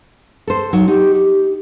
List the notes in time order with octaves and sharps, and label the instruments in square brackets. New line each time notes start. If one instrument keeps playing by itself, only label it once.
[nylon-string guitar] A4 C5
[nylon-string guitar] F#3 [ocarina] D#4
[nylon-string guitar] D#4 [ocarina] G4
[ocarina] G4